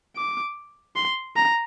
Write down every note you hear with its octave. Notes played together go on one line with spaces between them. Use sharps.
D6
C6
A#5